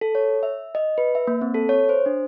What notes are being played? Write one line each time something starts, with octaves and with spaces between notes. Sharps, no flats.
A4
C#5
E5
D#5
B4
E5
A#3
C4
A4
C#5
C5
D4